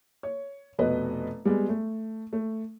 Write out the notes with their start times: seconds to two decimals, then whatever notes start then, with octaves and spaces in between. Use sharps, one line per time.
0.23 C#5
0.79 F1 B2 B4 D#5
1.45 G3 G#3 B3
1.69 A3
2.33 A3